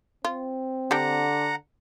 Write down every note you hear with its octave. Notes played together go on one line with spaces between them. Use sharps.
C4 F4
D3 G3 D4 F#5 G5 A#5